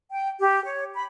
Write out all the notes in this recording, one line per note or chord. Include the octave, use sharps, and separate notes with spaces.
G5
G4
C#5
B5